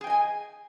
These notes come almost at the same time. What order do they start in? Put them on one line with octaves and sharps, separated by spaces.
G#4 G5 D#5 G#5